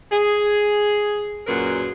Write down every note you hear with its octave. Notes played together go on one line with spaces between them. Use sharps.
G#4
F#2 A#2 F#3 G#4 A#4 B4